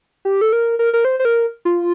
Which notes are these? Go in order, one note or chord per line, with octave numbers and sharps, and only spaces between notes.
G4
A4
A#4
A#4
A#4
C5
C5
A#4
F4